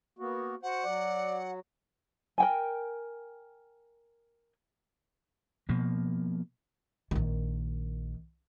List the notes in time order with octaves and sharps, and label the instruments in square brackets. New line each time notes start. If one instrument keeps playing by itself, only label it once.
[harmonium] A#3 B3 F#4
[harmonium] F#4 C5 [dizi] F#5
[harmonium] F#3 [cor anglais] D5
[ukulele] A#4 G5 G#5
[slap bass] B2 F3 A#3
[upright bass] A#1 D#3